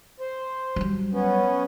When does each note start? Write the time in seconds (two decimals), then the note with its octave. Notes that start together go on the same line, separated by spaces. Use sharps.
0.20 C5
0.76 F#3 G3
1.12 B3 C#4